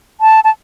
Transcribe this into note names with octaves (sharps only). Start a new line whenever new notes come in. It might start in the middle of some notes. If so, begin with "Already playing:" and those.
A5
A5